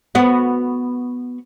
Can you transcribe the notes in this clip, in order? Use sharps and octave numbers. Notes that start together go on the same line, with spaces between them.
B3 F#4